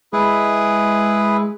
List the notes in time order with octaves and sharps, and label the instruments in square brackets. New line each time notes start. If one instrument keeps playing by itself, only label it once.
[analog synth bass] G#3 [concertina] E4 G#4 B4